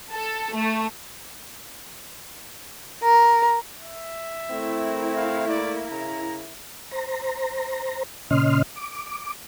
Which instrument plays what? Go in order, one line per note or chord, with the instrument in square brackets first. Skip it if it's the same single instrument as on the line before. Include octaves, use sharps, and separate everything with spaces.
[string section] A4
A3
[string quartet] A#4
[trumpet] E5
[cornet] A3 [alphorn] C4 [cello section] E4 A#4
[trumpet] F5
[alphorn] A#3 [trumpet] D5
[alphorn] C#3 [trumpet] A#5
[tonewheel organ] C5 A#5
A#2 C#3 C#4 D#5 C6 F6
D6